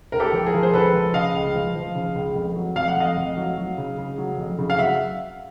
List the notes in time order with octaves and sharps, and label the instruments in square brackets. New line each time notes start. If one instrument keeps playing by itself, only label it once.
[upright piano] C#2 A#4
G4 A4
F3
G#4 A#4
F3
C5
C#2 A4 B4
F3
C#3 D#5 F5
C#2
F3
F3
C#3
C#2
F2
F#3
F2 F5
F#5
F2 D#5 F5
F2
F#3
F#3
C#3
C#3
F#3
F2
C#3
F5
F#3 E5 F#5